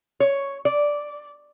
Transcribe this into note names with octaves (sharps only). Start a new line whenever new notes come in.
C#5
D5